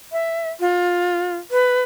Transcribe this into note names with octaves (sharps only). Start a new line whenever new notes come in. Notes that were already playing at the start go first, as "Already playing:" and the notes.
E5
F4
B4